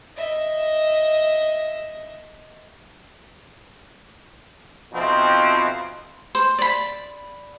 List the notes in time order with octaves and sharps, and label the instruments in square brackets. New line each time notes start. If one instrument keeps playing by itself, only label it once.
[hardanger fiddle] D#5 E5
[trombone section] F2 B2 F3 C4 D#4 E4
[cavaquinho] C5
D5 B5